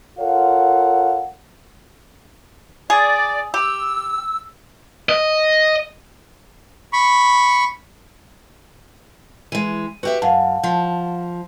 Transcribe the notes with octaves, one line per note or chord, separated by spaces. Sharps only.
F4 A4 A#4 C#5 F5 F#5
G#4 D5
G4 E6
D#5
B5 C#6
E3 G#3 D#7
F#4 G4 B4 E5
F#2 F5 F#5 A5
F3